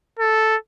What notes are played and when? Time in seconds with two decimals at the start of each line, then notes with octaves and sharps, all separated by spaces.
0.19 A4